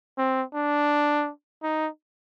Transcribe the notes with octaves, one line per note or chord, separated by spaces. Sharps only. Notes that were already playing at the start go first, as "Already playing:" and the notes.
C4
D4
D#4